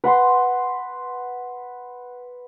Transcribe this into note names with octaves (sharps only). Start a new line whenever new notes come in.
B4 F#5 C6